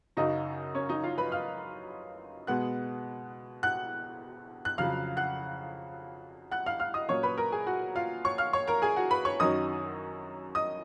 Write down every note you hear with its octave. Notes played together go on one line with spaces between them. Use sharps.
F#2 C#3 F#3 D#4 D#5
C#4 C#5
D#4 D#5
F4 F5
B4 B5
F5 F6
B2 G#3 B3 F#5 F#6
F#5 F#6
F#6
F2 C#3 F#3 F5 F6
F#5 F#6
F#5 F#6
F5 F6
F5 F6
D#5 D#6
A#2 F#3 C#4 C#5 C#6
B4 B5
A#4 A#5
G#4 G#5
F#4 F#5
F4 F5
C#5 C#6
F5 F6
C#5 C#6
A#4 A#5
G#4 G#5
F#4 F#5
B4 B5
C#5 C#6
F#2 D#3 F#3 C#4 D#5 D#6
D#5 D#6